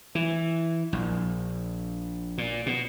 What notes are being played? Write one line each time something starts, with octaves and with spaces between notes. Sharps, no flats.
E3
A#1
A#2
B2